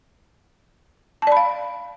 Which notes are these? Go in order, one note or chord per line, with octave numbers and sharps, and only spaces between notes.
D5 F5 A5 B5